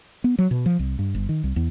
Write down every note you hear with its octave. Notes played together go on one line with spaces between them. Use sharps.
B3
F#3
B2
F3
C2
G2
G1
D#3
C2
E2